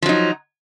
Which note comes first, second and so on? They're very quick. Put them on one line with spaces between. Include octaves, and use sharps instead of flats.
F3 F#3 D#4